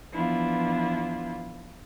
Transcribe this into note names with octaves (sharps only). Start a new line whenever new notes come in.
E3 F3 B3 D4 E4 F4